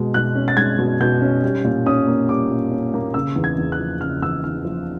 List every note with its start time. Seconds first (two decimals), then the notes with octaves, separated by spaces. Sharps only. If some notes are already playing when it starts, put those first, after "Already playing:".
Already playing: B2 G#3
0.14 B2 F#6
0.35 C#4
0.48 A6
0.57 G#3 G#6
0.78 B2
1.00 B2 G6
1.22 C#4
1.43 G3
1.64 A#2
1.86 C#4 D#6
2.07 A#3
2.29 G3 D6
2.50 A#2
2.71 C#4
2.94 A#3
3.14 C#3 E6
3.36 E2
3.44 G#6
3.58 E2
3.72 F#6
3.79 F3
4.01 C#3 F6
4.22 E2 E6
4.44 E2 F6
4.65 F3